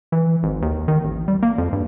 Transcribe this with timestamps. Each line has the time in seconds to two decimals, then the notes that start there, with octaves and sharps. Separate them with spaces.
0.12 E3
0.43 G#1
0.62 D#2
0.88 D#3
1.04 A1
1.28 G3
1.42 A#3
1.58 F2
1.73 G2